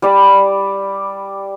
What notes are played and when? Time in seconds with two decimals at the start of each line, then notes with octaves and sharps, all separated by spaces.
0.02 G3 D5 B5